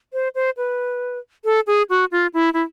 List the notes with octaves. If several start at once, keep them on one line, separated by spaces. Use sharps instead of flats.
C5
C5
B4
A4
G#4
F#4
F4
E4
E4